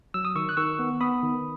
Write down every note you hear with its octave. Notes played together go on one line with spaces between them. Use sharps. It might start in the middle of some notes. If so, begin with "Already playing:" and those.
F#3 E6
D#6
D#3 C#6 E6
F#6
D#3 C#6 E6
B3
B3 B5 D#6
D#3